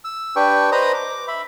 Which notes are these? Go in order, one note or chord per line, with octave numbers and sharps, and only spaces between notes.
E6
D4 G4 B4 G5 C#6
B4 C5 D#5 A#5 D#6
D6
E5 B5